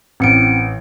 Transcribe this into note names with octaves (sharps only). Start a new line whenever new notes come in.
A1 C4 C#7 D7